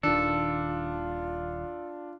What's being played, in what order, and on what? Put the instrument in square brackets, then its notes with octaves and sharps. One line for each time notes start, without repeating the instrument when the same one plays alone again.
[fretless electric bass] D#1 D#3 [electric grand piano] D4 [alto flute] F4 [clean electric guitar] A4